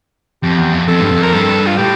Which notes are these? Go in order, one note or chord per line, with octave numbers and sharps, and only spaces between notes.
F2 G4
E2
F2
F2 A4
G2
F2
A#4
G2 A4
F4
A2 G4